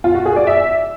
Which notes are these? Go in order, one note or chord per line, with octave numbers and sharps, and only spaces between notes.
F4
F#4
G#4
D5
E5